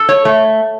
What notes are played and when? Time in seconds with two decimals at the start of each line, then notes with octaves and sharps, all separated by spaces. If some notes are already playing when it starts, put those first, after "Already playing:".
Already playing: A4
0.09 C#5
0.25 A3